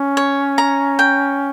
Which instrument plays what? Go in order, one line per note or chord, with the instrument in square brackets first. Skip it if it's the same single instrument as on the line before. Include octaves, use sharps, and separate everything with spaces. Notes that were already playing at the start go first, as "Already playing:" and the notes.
Already playing: [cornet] C#4
[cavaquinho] C#5
A#5
G5